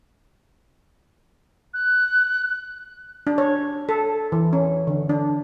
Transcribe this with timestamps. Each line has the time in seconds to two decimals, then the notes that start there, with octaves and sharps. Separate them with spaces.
1.74 F#6
3.27 D4
3.38 C#5
3.89 A4
4.32 E3
4.53 C#4
4.87 D3
5.09 D4